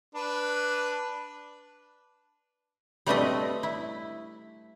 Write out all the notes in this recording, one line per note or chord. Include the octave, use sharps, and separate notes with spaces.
D4 B4
G3 A3 C4 D4 B4 D#5
E4